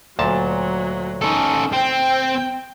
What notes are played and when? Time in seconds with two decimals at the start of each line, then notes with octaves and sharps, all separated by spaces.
0.19 D2 A#2 F#3 A5
1.22 C#4 D#4 A4
1.73 C4 G5